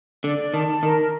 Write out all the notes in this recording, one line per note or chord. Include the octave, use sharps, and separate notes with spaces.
D3 D5
D#3 A5
D#3 A#4